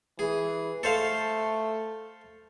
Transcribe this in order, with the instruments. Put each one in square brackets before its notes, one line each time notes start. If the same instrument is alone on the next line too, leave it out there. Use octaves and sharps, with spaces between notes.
[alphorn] E3 [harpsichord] G#4
[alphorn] A3 [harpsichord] A4 C5 F5